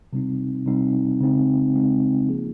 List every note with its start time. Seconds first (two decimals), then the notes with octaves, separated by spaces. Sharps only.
0.13 C3 G3 C4 D#4
0.66 C3 G3 C4 D#4
1.20 C#3 G#3 C4 D#4
1.74 C#3 G#3 C4 D#4
2.28 F3 A#3 F4 G#4